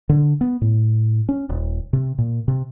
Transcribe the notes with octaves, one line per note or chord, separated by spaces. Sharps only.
D3
B3
A2
C#4
D#1
C3
A#2
C3